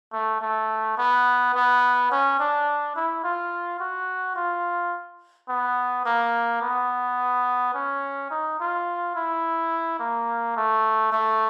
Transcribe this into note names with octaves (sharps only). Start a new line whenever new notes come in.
A3
A3
B3
B3
C#4
D4
E4
F4
F#4
F4
B3
A#3
B3
C#4
D#4
F4
E4
A#3
A3
A3